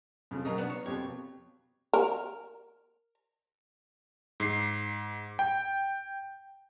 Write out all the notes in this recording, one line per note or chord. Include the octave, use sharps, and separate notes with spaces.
F2 C#3
B2 F#3 A#4 A#5
B3 D4
C#5
F2 B2 G4 C#5
A#4
G#2 C7
G5